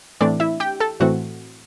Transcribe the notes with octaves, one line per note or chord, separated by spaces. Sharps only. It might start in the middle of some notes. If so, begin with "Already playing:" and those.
A2 E3 A3 C4 D4 D5
E4 E5
G4 G5
A4 A5
A2 E3 A3 C4 F#4 F#5